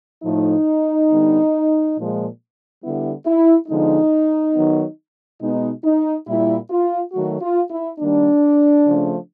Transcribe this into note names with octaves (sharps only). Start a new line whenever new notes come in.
A2 F3 A3 D#4
D3 G3 B3
A#2 F3 G#3
D3 G3 B3 E4
E4
D3 F3 G#3 B3 D#4
D#3 F#3 B3
B2 G#3 B3 D#4
D#4
A#2 G3 A#3 E4
F4
D#3 F#3 A3 F#4
F4
E4
D#3 G3 A#3 D4
C#3 F3 A3